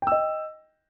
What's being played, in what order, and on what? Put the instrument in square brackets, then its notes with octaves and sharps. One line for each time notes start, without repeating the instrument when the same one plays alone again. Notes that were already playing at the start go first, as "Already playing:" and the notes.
[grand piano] G5
E6
D#5